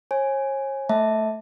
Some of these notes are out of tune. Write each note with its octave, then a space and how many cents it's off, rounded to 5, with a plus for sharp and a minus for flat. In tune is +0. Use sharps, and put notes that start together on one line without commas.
C#5 -40 G#5 +0
A3 +0 E5 -25 A5 +0